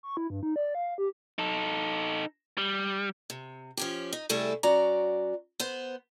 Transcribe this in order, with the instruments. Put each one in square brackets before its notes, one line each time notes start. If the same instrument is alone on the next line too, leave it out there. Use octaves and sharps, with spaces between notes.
[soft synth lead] C#6
E4
G2
D#4
D5
F5
G4
[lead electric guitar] D#4 A4
G3
[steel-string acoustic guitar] C3
F3 C#4 G4
D#4
C3 G3 A3 E4 G#4 A4
F#3 C#4 F#4 D5 A#5
B3 C5